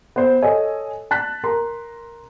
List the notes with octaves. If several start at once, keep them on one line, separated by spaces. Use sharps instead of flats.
B3 C5
A4 C#5 D#5 G#5
A5 F#6 B6
A#4 A#5 C6